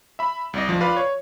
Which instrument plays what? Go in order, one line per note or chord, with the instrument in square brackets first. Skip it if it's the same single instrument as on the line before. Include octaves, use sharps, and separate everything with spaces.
[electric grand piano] E5 B5
C2 D5 D#5
D2 F3
F4 B4 D5 F5
C#5